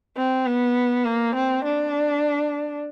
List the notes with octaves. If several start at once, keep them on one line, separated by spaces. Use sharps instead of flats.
C4
B3
A#3
C4
D4